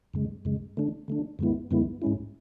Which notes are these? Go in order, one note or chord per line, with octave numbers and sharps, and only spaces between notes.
F#2 C#3 G#3
F#2 C#3 G#3
D3 A3 D4
D3 A3 D4
F#2 D3 G#3 B3 E4
F#2 D3 G#3 B3 E4
G#2 G#3 C#4 E4